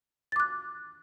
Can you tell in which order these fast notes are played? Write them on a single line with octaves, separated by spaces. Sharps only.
A6 D6 F#6